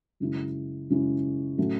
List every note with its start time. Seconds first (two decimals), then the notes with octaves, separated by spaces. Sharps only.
0.20 F#2 C#3 G#3 C#4 E4
0.90 F#2 C#3 G#3 C#4 E4
1.58 A2 F#3 A3 C#4 F#4